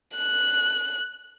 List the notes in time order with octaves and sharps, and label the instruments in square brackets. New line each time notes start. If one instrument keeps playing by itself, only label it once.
[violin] F#6